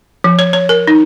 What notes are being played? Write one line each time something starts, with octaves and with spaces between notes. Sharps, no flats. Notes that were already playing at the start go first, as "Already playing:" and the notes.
F3
C#5
C#5
A#4
D#4